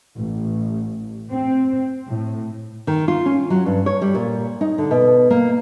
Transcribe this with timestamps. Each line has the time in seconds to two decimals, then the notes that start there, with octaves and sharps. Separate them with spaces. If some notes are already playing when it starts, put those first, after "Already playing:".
0.17 A1
1.30 C4
2.07 A2
2.87 D#3
3.08 F4
3.26 C#4
3.50 F#3
3.66 G2
3.86 C#5
4.02 G3
4.15 A#2
4.61 D#4
4.78 D3
4.91 B2
5.30 A#3